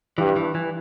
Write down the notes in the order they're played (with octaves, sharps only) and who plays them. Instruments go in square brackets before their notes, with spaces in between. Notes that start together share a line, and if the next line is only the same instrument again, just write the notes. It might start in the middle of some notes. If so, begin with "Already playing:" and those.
[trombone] G2 [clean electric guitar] E3
[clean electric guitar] E3
E3